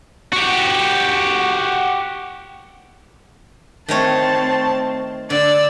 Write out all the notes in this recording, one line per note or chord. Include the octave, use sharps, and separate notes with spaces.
F#4 G4
D#3 A3 C4 C#5 A5
D3 D5 E6